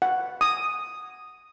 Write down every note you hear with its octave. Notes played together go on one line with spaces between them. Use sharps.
F#5
D#6